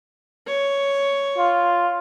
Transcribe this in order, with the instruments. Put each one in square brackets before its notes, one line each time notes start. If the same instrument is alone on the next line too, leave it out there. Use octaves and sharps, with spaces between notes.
[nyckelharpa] C#5
[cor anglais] F4